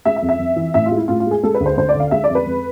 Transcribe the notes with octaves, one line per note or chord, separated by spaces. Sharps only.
G#3 E5
E5
F2
E5
F2
E3
A2 E5
F4
G#3
E4
A2 F4
F4
G#3 G#4
G#3 A4
B4
D2
C5
D2 C5
D5
D3 F5
G#3 E5
D5
F2
B4
F2